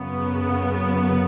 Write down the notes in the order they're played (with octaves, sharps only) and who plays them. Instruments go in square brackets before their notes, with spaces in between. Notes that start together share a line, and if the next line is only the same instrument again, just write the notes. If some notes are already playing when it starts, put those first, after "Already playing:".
Already playing: [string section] F#2 C#3 B3